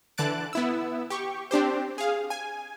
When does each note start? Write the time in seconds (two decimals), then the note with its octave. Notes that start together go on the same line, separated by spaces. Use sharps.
0.18 D3 E3 A5 F#6 A6 D7
0.53 B3 E4 E6
1.10 G4 C#6
1.51 C4 D4 G4 C5
1.98 G#4 F5
2.30 G#5